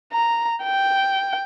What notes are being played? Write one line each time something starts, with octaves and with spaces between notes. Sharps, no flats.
A#5
G5